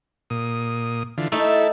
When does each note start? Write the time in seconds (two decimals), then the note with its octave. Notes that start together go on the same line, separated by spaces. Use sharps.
0.30 A#2 D#6
1.18 D3 E3 F4
1.32 A3 D#4 E4 A4